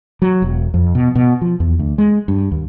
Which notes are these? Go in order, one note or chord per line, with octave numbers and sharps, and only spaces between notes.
F#3
E1
F2
B2
B2
F3
E2
D2
G#3
G2
D#2